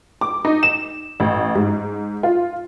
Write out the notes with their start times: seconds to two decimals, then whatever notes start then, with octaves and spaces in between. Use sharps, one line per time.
0.21 D6
0.45 D#4
0.63 E7
1.20 A1
1.55 G#2
2.23 F4